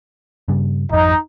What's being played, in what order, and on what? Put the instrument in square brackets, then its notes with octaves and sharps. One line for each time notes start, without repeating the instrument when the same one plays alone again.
[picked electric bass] G2 C#3 G3
[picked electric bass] G#1 F2 [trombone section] D#4